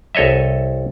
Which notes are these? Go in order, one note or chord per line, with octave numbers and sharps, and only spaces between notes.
C2 A4 C#5 D#5 E5